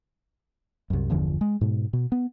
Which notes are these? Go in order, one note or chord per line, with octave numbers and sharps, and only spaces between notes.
C2 F#2
G1 E2 D3 F3
G#3
G#2 B2
B2
B3